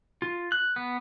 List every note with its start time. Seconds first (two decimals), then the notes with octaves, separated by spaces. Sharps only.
0.22 F4
0.52 F#6
0.76 B3